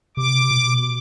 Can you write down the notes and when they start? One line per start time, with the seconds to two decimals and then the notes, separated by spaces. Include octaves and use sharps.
0.17 C3 D6
0.51 B2